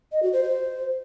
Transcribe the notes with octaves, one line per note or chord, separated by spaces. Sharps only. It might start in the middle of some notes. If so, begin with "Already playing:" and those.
D#5
F#4
C5
C5